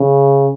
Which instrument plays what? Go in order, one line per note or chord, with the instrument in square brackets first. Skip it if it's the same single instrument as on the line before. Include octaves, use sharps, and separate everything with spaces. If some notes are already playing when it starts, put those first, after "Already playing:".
Already playing: [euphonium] C#3